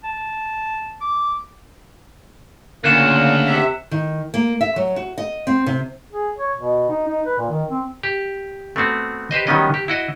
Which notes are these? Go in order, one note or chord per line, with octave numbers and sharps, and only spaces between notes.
A5
D6
D2 A#2 C#3 A#3 F#6 C#7 E7
C3 E5
D#3
A#3
E5
F#3
F#4
D#5
C4
C3
G#4
C#5
B2
D#4
D#4
B4
A#2
D#3
C4
G4
A3 B3 C4 F#4
G4 B4 C5 D#5
D#3 F#3 G3 B3 C#4 D#5
G4
E4 F#4 D#5